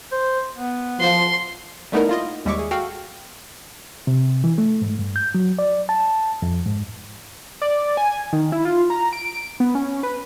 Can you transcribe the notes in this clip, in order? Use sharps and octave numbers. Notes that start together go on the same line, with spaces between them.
C5
B3
F3 C6
G3 A3 B3 D#4 E4 A#4
A#3 F4 D#5
D#2 G3 G#3 E5 C#6 D6
G#4
F#4 A4 F5 G5 F6
C3
E3
A3
G#2
G2
G6
F#3
D5
A5
F2
G#2
D5
G#5
D#3
E4
F4
A#5
D7
B3
C#4
B4